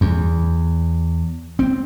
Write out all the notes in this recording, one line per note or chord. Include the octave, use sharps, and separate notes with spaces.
E2
C4